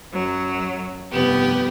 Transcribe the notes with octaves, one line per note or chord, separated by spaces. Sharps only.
F#2 F#3
F1 G2 B3 G4